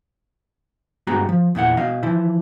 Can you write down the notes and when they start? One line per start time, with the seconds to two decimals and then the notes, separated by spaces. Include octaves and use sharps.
1.07 G2 G#3 B3 F#4 G4 A#5
1.29 F3
1.55 E2 A#2 E4 F#5
1.77 B2 D#5 F5
2.03 E3 F3 E4